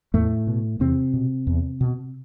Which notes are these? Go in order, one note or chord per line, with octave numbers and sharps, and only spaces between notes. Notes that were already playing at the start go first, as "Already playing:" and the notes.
E2 A2 A3
B2
E2 C3 C4
B2
E2
B2